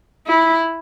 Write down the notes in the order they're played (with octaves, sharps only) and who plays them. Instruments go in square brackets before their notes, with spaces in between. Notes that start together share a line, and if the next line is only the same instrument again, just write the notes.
[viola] E4